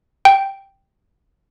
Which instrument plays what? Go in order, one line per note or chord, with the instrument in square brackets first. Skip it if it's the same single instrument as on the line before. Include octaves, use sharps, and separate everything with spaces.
[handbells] G5